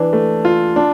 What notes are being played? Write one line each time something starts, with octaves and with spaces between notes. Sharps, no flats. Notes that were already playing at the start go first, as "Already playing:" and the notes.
Already playing: E3 D4
A3
F4
D4